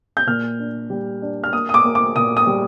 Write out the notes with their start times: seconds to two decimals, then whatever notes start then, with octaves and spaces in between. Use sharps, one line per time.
0.17 G6
0.27 A#2 F6
0.59 D4
0.90 G3
1.22 D4
1.44 F6
1.53 A#3 D#6
1.69 D#6
1.74 D6
1.84 A#3
1.95 D6
2.16 A#2 D#6
2.37 D#6
2.47 G3